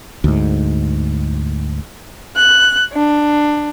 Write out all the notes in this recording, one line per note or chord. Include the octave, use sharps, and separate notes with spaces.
D2 G#2
F#6
D4